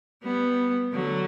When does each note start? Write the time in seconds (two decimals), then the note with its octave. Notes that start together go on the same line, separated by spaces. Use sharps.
0.23 G3 B3
0.93 D3 F#3